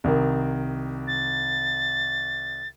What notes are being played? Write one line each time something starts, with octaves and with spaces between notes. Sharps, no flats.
C2 D#3
A6